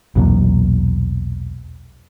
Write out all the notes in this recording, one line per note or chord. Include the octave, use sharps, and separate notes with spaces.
B1 E2 A#2 F#3